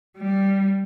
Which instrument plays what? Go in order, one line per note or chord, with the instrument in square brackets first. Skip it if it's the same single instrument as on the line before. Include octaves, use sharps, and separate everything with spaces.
[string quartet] G3